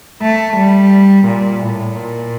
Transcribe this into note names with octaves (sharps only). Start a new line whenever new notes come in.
A3
G3
A#2
A2
A#2